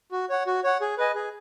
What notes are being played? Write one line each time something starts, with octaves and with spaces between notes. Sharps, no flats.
F#4
C#5 F#5
F#4
C#5 F#5
G#4
B4 D#5 G#5
G#4